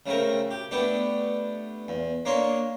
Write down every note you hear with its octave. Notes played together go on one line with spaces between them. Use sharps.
C#3 A3 C4 A#4
G4
A3 B3 D4 G4
E2
A#3 D4 C#5 C6